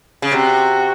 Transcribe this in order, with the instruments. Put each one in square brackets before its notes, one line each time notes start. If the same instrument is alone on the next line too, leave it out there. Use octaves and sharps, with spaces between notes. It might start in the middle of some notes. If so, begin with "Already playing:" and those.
[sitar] C#3
[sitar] C3 [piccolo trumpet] F#4